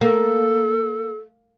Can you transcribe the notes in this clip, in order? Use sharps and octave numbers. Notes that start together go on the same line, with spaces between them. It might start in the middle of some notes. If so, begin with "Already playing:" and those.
A#3 A4